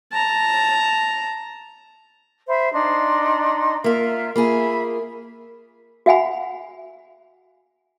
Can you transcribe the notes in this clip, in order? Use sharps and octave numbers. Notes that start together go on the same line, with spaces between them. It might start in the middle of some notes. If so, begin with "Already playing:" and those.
A5 A#5
C5 E5 B5
D4 D#4 C6
A#3 F4 A#4 E5
A#3 F4 G#4 E5 B5
F#4 E5 F#5 G#5 B5